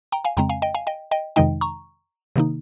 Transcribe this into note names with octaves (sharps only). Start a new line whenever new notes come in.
G5 A#5
F5 G#5
F2 C#3 G#3 C4 G5 A#5
F5 G#5
D#5 G5
F5 G#5
D#5 G5
D#5 G5
F2 C3 D#3 G#3 D#4 D#5 G5
A#5 C#6
C3 D#3 A#3 D#4